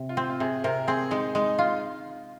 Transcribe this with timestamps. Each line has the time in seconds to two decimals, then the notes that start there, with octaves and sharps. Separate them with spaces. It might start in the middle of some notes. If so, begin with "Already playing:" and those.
Already playing: C3
0.09 F4
0.17 C4
0.30 F4
0.40 C3 G#4
0.64 C3 A#4
0.87 C4 G#4
1.11 G#3 D#4
1.35 G#3 D#4
1.59 F4